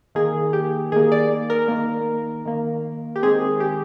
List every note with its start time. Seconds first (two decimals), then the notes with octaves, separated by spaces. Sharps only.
0.15 D#3 A#3 G#4
0.53 G4
0.92 D#3 A#3 G#4
1.12 D5
1.50 A#4
1.68 D#3 A#3
2.46 D#3 A#3
3.16 G4
3.23 D#3 G#3 C4 G#4
3.60 G4